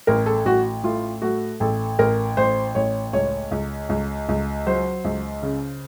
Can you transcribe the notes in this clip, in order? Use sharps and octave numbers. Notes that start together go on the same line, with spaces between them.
A1 A#4
A4
A1 F#4
A2 F4
A3 F#4
A1 A4
A1 A#4
A1 C5
A1 C#5
C#2 C#5
C#2
C#2
C#2
F#3 C5
C#2
C#3